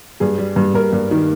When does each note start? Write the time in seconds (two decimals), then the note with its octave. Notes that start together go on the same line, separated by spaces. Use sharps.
0.20 G2 G#4
0.38 G3
0.56 G2
0.74 G2 A#4
0.93 G2
1.11 D#3